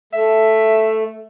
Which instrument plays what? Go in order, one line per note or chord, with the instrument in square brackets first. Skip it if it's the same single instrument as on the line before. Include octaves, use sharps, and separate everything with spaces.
[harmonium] A3 [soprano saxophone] E5